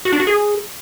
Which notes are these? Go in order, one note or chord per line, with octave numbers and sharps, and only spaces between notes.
F#4
D4
F#4
G#4